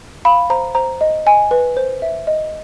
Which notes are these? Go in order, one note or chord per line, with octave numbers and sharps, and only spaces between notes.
F5 B5
C5 A#5
C5 A#5
D#5
D#5 G#5
B4
C5
E5
D#5